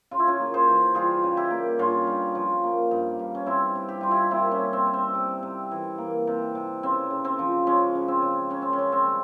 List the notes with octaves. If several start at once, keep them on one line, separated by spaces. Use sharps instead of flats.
C#3 F4
E4
C#4 F4
A#3
G#4 C5
E3
G3 F4 G#4
C#3
E4 G4
A#3
G2 C#4 F4
G2
F3
A#3
G2
G2
C#4
C3 C4 E4
C3
G4
G3 F4
E4 G4
A#3 C4 E4
C#4
C3
C4
C3
C4
C3
C3
E3
A#3
C3
C3
C#3 C4
C#3
C4
F3
G#3 C#4
C#3
C4
C#3
C#3 C#4
C4
C#4
C#3
C4
G3